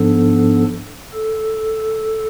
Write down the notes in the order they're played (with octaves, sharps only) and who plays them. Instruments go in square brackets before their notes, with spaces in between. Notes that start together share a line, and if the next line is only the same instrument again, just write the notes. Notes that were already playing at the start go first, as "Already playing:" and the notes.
Already playing: [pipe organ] G#2 F3 B3 D4 A4
A4